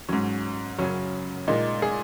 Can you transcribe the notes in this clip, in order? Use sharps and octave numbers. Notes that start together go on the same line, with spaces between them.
G#2 F#3 C#4
F#2 C#3 F#3 C#4
A#2 G#3 D#4
G#4